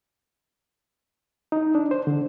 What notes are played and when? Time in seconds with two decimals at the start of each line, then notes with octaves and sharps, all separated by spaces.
1.52 D#4
1.75 D4
1.91 C5
2.07 D3